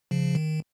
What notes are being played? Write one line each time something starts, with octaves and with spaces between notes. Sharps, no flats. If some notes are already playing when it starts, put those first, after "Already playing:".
C#3 F3
D#3